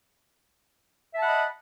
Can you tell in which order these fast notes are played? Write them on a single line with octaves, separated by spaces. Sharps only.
E5 A5 F#5 B5 D#5